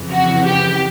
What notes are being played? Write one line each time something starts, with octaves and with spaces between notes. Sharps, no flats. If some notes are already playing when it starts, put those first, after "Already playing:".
Already playing: F2 C#3 E3
F#4
G4